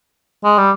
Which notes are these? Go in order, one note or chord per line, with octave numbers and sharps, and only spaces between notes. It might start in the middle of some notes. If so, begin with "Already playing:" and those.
G#3
G3